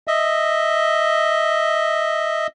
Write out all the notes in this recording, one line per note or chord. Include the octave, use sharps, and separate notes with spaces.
D#5 E5